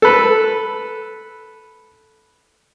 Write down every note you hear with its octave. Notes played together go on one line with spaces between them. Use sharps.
A4 B4